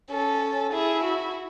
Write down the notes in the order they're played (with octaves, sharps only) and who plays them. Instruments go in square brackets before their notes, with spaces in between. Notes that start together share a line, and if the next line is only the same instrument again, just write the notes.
[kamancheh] C#4 [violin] A4
[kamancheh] E4 [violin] G#4
[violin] F#4